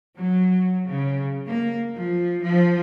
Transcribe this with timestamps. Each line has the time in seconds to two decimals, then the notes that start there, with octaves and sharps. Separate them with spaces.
0.15 F#3
0.87 C#3
1.45 A#3
1.95 F3
2.42 F3